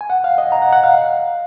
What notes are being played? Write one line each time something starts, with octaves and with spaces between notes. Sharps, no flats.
G#5
F#5
F5
D#5
A#5
F#5
F#5
F5